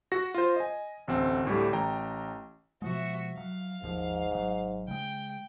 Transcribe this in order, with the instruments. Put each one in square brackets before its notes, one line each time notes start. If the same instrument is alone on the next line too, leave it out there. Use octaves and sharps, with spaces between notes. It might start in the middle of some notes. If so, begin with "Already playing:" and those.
[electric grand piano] F#4 A#6
F4 C5
D#5 G#5
A1 D2 C4
D2 A2 G3
A1 G5 A#5
[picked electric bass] B2 F3 G#3 [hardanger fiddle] F#4 E5
[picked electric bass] F#3 [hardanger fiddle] F5
[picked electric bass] G1 D#2 F3 [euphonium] G#2
[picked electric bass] G#1 F#3
[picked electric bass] C#3 G#3 [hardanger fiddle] G5